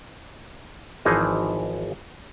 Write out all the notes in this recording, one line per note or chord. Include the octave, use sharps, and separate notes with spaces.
G#1 E3 F3 D#4 G#4 D#5